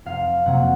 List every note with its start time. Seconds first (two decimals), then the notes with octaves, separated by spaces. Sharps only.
0.05 F1 F5
0.45 F2 C3 F#3 A#3 F#5